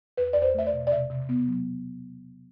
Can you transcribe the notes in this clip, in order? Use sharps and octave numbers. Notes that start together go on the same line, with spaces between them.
E2 B4
E2 D5
C5
A3 E5
D5
B2
D5
C3 E5
C3
B3
F#3